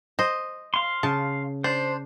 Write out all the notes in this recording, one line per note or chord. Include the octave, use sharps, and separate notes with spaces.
C5 D#5
F5 C6
C#3 A5
D4 C5